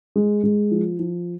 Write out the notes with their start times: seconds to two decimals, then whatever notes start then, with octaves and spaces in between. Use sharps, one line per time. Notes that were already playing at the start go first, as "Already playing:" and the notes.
0.16 G#3
0.44 G#3
0.71 F3
0.99 F3